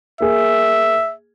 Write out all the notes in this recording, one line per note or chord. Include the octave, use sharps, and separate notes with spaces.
A#3 G#4 E5